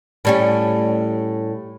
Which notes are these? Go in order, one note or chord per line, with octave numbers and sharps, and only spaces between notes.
A2 G3 C#4